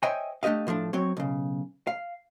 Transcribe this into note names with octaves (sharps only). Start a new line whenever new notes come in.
C5 C#5 D#5 E5 G5 G#5
A3 D4 G4 D#5 F5
A2 F3 A3 D4
F#3 C4 C#5
B1 C#3
F5